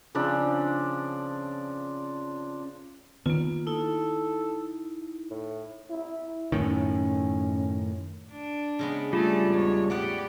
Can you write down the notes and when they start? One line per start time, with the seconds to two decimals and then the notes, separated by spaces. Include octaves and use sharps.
0.15 C#3 F3 C4 D4
3.26 D#3 A#3 B3 F4
3.67 D#4 E4 A4
5.31 A2
5.90 E4
6.52 F#2 A2 D#3 C#4
8.31 D4
8.79 C#3 G#3 B3
9.13 G3 A3 F4 G#4 A4 A5
9.48 E2 G#2 C#5
9.90 A2 B3 G4 D5 F#5